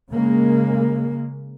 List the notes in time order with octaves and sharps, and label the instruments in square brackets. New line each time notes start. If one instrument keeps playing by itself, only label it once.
[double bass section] C#3 G#3 A#3